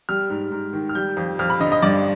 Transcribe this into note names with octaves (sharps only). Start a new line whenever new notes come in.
G3 F6
G#2
G#2
D#3
F6
G3 G6
F2
F2 F6
B5
D3 D#5
D#5
G2 D5